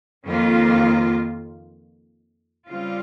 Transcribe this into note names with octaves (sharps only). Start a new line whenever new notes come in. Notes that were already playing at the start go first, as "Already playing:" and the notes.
F2 D#3 A#3 F4
C#3 G3 C4 F4